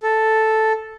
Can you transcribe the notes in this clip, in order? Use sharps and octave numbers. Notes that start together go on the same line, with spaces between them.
A4